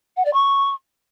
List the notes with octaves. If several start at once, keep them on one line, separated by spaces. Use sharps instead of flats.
F#5
D5
C#6